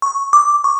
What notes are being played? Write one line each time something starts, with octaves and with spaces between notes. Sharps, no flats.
C#6
D6
C#6